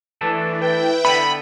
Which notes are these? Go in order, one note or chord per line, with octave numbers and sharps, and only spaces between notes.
E3 A3 D4 A4
E4 B4 G5
D3 B3 B5